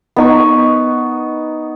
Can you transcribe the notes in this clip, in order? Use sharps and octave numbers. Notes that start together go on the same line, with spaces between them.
B3 D#4 C#6